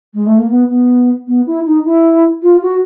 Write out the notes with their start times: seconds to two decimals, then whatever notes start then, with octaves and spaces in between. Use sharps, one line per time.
0.14 G#3
0.26 A3
0.38 A#3
0.50 B3
0.69 B3
1.27 B3
1.47 E4
1.66 D#4
1.85 E4
2.43 F4
2.62 F#4